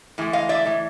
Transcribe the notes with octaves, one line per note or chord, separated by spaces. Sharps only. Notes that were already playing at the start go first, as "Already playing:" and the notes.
A2 E3 G#3
D#5 F5
D5 E5
A2 E3